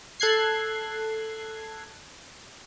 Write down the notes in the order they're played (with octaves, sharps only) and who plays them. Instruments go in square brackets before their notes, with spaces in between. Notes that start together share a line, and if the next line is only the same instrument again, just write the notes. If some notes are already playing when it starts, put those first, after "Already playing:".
[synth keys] A4 F#6 G#6 C7